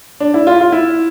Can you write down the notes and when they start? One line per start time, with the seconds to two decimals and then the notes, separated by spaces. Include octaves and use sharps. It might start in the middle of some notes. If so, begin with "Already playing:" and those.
0.20 D4
0.34 E4
0.47 F4
0.60 F4
0.72 E4